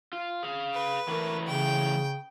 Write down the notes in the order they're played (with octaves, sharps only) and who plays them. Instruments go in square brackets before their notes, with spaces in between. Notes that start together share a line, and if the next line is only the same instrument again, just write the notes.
[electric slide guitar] F4
G#4 F5
[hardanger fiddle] B4
[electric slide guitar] E3 F#3 A3 [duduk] A#4
[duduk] C#3 [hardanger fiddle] G5